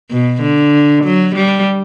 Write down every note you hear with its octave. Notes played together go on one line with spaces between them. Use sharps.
B2
D3
F#3
G3